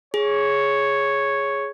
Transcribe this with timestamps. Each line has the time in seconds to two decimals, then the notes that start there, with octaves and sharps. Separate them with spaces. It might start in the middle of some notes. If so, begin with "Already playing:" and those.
0.14 G#4 C#5